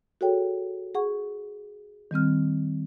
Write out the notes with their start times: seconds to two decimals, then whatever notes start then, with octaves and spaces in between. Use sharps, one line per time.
0.21 F#4 G#4 A4 C#5 G5
0.95 G#4 F#5 C#6
2.11 D#3 G3 C4 F6